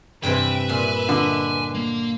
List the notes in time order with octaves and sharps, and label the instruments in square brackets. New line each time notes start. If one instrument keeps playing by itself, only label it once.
[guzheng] G2 C3 E3 [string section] B4 E5 [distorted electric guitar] G5
[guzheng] A#2 [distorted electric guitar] G#5
[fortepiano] D3 [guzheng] D#5
[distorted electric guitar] A#3